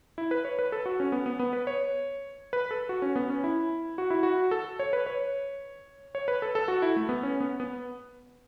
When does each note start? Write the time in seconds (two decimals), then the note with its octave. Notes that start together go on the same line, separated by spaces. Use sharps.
0.18 E4
0.31 B4
0.45 C#5
0.59 B4
0.72 A4
0.86 F#4
1.00 C#4
1.12 B3
1.26 B3
1.39 B3
1.53 B4
1.67 C#5
2.53 B4
2.71 A4
2.89 F#4
3.02 C#4
3.16 B3
3.30 C#4
3.44 E4
3.98 F#4
4.10 E4
4.23 F#4
4.51 A4
4.79 C#5
4.93 B4
5.06 C#5
6.15 C#5
6.28 B4
6.42 A4
6.55 A4
6.68 F#4
6.82 E4
6.96 A3
7.09 B3
7.23 C#4
7.40 B3
7.60 B3